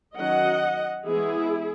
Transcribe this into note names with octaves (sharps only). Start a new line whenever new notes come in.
D#3 F#3 C#4 D#5 F#5
E3 G#3 B3 E4 G#4